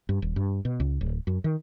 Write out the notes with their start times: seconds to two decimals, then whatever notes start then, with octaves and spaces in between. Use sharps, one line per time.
0.09 G2
0.22 D#1
0.36 G2
0.65 B2
0.80 C#2
1.01 D1
1.27 F#2
1.44 D#3